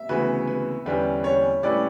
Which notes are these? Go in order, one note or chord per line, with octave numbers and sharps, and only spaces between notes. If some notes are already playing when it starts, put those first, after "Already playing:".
Already playing: E5
D2 C#3 E3 B3 F#4 B4
B4
E2 D3 G3 C#4 B4
C#5
A2 G3 C#4 E4 B4 D5